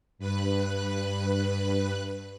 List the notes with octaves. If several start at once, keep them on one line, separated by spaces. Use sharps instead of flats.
G2 B4 F#6